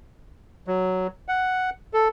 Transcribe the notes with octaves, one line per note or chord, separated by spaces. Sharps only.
F#3
F#5
A4